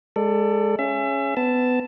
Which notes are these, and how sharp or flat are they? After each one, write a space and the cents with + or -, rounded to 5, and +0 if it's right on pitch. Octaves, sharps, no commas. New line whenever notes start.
G#3 +0 A4 +25 D5 +0
C#4 +0 G#4 +0 E5 +30
B3 +25 A5 +0